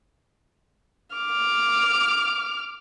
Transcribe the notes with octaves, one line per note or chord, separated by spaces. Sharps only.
D6 F6